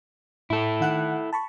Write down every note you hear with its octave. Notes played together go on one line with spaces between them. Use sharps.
A2 E4 A4
D#3 F#5 F#6
A5 B5 C#6